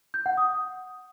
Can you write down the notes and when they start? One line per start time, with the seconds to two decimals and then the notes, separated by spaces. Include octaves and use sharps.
0.14 G6
0.26 F#5
0.37 D#6